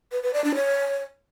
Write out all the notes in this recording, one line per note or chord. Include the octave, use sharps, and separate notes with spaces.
B4
B4
D5
D4
C#5